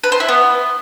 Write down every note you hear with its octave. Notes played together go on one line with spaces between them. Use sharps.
B4
C5
E4
B3